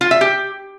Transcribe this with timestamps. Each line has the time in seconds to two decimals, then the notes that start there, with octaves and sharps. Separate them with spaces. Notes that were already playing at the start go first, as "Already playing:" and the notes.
0.01 F4
0.11 E5
0.21 G4